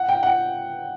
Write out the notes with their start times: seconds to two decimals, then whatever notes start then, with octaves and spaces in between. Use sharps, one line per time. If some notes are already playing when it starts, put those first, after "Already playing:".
Already playing: F#5
0.09 G5
0.23 F#5